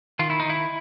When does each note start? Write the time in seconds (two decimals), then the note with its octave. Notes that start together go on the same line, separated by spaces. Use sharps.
0.19 D#3 F4
0.30 E4
0.40 D#4
0.45 D#3 E4